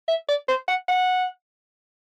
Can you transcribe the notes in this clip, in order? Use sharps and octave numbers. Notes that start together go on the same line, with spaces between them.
E5
D5
C5
F#5
F#5